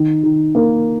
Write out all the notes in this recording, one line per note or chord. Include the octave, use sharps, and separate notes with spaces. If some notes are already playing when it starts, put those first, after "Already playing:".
Already playing: D#3
D#3
A#3